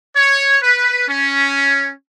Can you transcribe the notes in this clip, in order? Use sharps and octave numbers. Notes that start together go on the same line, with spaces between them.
C#5
B4
C#4